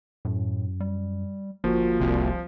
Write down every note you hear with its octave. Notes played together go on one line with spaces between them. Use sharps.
F#2 A2
G3
G1 F3 A#3 F4 F#4
F1 C2